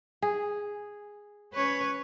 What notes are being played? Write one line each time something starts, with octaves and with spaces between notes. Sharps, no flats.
G#4
C#4 B4 C#5